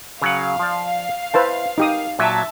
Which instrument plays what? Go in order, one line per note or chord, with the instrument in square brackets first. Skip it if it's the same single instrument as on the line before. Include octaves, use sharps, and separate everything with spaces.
[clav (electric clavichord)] C#3 F#3 F#5 [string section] F5
[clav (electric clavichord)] F3 D5
[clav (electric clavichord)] E4 D#5 [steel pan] B4 C5 A5
[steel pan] D#4 G4 D#6 [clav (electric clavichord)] A#4
[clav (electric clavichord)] A#2 F#3 [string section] E5 A5